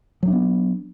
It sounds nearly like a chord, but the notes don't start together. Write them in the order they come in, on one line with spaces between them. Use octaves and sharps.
F#3 D4 B3